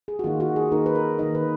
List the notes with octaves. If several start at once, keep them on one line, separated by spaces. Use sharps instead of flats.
G#4
F#4
D#3 A#3 D#4 F4
F#4
G#4
D#3 A#3 D#4 A#4
B4
A#4
D#3 A#3 D#4 D#5
B4